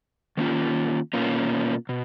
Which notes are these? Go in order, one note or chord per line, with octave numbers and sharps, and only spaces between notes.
D#3 A#3 C#4 F4
B2 A#3 C#4 F4
B2